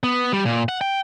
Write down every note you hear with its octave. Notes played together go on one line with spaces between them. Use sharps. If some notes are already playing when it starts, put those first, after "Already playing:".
B3
G3
A#2
F#5
G5